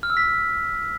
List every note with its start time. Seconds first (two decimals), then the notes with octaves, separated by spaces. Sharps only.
0.03 F6
0.10 E6
0.17 B6